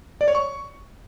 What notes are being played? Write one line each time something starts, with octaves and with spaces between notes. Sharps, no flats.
D5
C#5
C#6